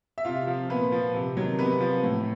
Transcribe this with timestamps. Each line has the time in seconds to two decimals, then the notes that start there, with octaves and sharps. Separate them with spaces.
0.18 E5
0.25 C3 F4 F5
0.47 F3
0.69 A#2 B3 B4
0.92 F3
1.14 C3
1.37 D#3 F#3
1.59 C3 B3 B4
1.81 F3
2.03 A2